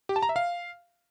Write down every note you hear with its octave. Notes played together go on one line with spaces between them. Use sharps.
G4
A5
A#5
E5
F5